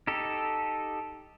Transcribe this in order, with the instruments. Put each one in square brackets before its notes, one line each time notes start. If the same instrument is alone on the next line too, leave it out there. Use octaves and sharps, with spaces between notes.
[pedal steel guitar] D#4 G4 A4